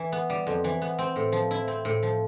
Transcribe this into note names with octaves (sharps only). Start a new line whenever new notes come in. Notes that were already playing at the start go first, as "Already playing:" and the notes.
Already playing: E3
B3
G3
F2
E3
B3
C4
A2
F3
E4
C4
A2
F3